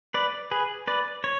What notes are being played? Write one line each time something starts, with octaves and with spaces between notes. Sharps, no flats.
B4 D5
G#4 B4
B4 D5
C#5